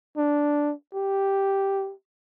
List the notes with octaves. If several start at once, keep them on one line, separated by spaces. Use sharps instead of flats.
D4
G4